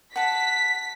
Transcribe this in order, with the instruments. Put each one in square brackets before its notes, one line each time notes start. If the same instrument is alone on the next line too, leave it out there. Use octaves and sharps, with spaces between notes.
[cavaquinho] F#5 A5 [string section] B6